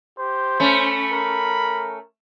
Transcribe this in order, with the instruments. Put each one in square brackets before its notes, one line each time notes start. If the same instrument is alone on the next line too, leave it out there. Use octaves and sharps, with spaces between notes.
[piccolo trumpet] G4 [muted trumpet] C5
[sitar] A3 C#4 [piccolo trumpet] B5
[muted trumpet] A#4